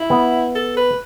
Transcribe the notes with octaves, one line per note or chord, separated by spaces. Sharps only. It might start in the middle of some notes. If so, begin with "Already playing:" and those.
Already playing: E4
B3
A4
B4